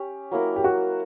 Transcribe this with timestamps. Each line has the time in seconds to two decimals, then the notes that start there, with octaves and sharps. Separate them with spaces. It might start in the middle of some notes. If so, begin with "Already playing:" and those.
Already playing: C#4 G4
0.31 F#3 A#3 E4 A#4
0.56 G4
0.64 F#4